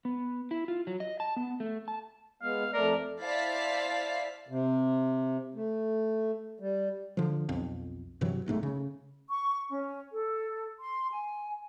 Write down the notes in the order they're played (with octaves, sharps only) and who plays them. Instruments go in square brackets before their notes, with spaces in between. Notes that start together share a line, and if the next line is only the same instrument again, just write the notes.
[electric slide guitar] B3
E4
F4
F#3
D#5
A5
B3
A3
A5
[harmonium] G#3 B3 [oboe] F5
[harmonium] F2 A3 D5 [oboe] A#4
[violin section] E4 C5 D5 F5 A5 B6
[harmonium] C3
A3
G3
[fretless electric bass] D3 F3
B1 F2
G2 C3 E3 F#3
F#1 B1 G#2 A3
C#3
[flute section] C#6
C#4
A4
C6
G#5